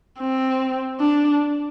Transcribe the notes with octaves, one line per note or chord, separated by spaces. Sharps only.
C4
D4